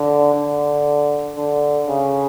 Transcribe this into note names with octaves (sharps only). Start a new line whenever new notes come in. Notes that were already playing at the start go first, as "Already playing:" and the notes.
Already playing: D3
D3
D3
C#3